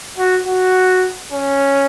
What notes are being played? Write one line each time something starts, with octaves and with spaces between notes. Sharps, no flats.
F#4
F#4
C#4